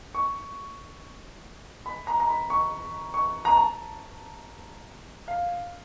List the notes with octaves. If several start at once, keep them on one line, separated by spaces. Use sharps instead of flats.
C#6
B5
A#5
A#5
B5
C#6
C#6
A#5
A5
F5